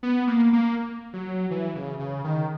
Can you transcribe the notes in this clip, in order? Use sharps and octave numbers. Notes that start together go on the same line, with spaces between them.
B3
A#3
A#3
F#3
E3
C#3
C#3
D#3